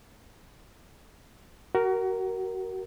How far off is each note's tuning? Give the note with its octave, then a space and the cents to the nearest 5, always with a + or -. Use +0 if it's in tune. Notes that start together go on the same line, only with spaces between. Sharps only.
F#4 +30 A#4 +0